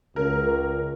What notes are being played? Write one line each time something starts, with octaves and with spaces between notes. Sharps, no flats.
C#2 C#3 A#4